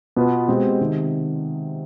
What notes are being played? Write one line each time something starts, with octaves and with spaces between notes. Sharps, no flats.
B2 B3 F4 B4
B2 G#3 C4 G4
C3 D#3